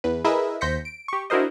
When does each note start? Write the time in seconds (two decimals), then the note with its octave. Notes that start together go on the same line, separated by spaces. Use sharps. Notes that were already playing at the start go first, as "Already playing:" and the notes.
0.04 E2 B4
0.24 E4 G#4 A#4 B4 D#5 E5
0.61 D#2 C5 G6 A#6 B6 C#7
0.85 D7
1.08 G4 C#6
1.30 D4 E4 F#4 A#4 C5 D#5